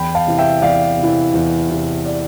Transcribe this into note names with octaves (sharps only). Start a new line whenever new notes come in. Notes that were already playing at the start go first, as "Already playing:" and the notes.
Already playing: E2 G5 B5
F5 A5
C3 E3
E5 G5
E2 D5 F5
C3
E3
E2
C3 E3
D5